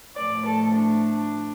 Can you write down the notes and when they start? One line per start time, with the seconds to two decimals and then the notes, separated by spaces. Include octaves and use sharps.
0.16 A2 F3 A3 D5
0.46 A4
0.77 D4